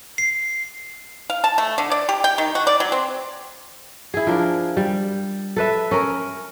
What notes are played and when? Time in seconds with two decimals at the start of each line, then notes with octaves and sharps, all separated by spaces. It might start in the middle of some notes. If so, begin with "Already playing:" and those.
0.18 C7
1.30 F5
1.44 A5
1.58 A3
1.78 D3
1.92 D5
2.09 G4
2.24 G5
2.38 D#3
2.55 F#4
2.67 D5
2.80 F#3
2.92 C4
4.14 E4 G#4
4.27 F3 D4 A#4
4.77 G3
5.56 A4 B4 E5
5.91 C#4 A#4